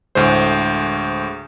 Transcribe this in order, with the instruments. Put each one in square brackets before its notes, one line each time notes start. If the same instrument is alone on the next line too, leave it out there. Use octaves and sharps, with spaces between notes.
[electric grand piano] D2 A2 G#3 G#4 C5